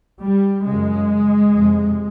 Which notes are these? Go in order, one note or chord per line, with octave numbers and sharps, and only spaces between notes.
G3
F#2 C#3 G#3
F2 C3